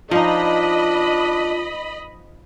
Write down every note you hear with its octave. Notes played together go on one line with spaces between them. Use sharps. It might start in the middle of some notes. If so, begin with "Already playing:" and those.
F3 D4 D#4 F4 D#5 B5